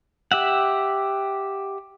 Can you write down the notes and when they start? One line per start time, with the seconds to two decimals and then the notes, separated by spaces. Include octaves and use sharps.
0.32 G4 E5 F#5